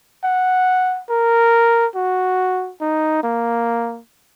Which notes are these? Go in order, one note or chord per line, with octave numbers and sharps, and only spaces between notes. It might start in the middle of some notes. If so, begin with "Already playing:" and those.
F#5
A#4
F#4
D#4
A#3